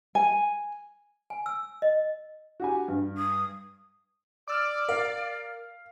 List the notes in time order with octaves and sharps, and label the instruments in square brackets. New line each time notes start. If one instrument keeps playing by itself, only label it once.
[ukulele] G#5
[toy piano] G#5
E6
D#5
[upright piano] F#4 G4 G#5
G2
[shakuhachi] D#6
[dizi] D5 [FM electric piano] D6 E6 F6
[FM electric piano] A#4 [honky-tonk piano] F5